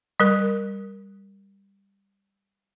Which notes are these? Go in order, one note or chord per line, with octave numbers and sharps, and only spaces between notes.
G3 A#4